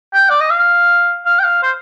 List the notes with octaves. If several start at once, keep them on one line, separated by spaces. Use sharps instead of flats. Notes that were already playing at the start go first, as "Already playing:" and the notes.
G5
D5
D#5
F5
F5
G5
F5
C5